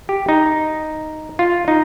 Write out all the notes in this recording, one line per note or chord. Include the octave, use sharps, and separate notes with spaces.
G4
D#4
F4
D#4